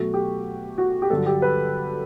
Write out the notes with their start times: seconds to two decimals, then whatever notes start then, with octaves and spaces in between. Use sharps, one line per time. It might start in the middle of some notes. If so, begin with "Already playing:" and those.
Already playing: B2 F#3 A3 F#4
0.14 G4
0.78 F#4
1.02 G4
1.10 G2 D3 F#3 A4
1.26 G4
1.42 B4